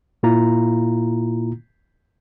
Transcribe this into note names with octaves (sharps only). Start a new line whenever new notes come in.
A#2 A#3 E4 F4 A#5